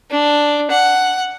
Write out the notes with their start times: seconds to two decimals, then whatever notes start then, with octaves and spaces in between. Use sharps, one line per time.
0.11 D4
0.71 F#5